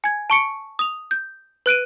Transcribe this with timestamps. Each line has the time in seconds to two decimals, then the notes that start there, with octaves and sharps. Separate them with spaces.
0.04 G#5 G#6
0.30 A5 C#6 C#7 D7
0.79 D#6 F7
1.11 G6
1.66 B4 F#6 D7 D#7